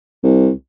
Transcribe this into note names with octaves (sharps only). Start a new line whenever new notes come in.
C2